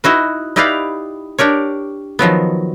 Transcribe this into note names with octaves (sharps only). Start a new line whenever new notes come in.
D#4 E4 F#4 B4
D#4 E4 G4 B4 D5 F5
D4 G4 A#4 C#5
D#3 F3 F#3 B3